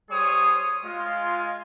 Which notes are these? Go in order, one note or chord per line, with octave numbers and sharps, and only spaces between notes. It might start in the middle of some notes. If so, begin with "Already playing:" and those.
G3 G#4 C5 C#5 D#6
G#3 F4